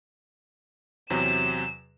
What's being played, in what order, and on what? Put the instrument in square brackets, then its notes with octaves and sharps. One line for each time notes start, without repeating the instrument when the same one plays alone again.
[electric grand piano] E2 C3 F#3 [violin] E7